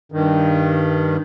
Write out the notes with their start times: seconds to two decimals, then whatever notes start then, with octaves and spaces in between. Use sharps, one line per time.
0.12 G2 D#3